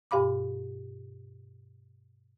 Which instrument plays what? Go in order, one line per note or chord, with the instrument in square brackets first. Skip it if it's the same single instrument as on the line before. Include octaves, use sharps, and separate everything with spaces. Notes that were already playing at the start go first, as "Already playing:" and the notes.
[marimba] G2 B2 G4 F5 B5 D6